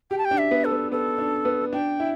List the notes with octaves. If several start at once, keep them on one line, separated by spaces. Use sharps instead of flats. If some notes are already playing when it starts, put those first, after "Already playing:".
G4 G5
A5
G5
D4
E5
B3
A4
B3
B3 A4
D4
B3
D4 G5
E4